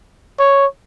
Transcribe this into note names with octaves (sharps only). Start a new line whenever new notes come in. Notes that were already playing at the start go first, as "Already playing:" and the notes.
C#5